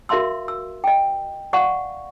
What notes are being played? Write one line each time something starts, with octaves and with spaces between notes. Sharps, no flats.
F#4 A#4 E5 F5 C6 E6
E6
D#5 G5
D5 F5 F#5 C#6